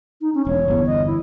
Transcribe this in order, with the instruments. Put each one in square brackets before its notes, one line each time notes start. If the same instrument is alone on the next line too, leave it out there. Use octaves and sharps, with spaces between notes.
[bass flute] D#4
C#4
[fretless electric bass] E1 [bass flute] C#5
[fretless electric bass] G1 E2
[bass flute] D#5
E4